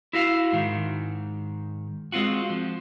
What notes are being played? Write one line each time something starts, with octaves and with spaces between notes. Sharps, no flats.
E4 F#4 F5
G#2 D#3
G#3 C4 F4 F#4
F3